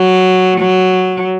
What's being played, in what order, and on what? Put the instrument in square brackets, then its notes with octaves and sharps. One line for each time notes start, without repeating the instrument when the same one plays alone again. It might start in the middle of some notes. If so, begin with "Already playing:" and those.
Already playing: [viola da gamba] F#3
F#3